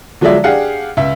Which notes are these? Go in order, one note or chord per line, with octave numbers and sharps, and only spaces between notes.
D3 F3 F#3 G#3 D5 E5
D4 G4 G#4 F5 F#5
C#2 E5